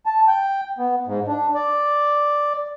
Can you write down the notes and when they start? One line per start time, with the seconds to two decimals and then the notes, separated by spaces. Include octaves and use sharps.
0.06 A5
0.28 G5
0.78 B3
1.07 G#2
1.28 D4
1.54 D5